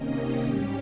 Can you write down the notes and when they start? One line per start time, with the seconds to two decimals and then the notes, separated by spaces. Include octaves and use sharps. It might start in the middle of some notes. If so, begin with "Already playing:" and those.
Already playing: C3 D#3 A#3 C#4 D#5
0.16 G4
0.44 G#2 G3 C#4